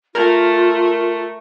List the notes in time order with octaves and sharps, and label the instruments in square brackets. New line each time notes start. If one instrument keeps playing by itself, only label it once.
[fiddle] A3 [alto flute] F4 [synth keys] A#4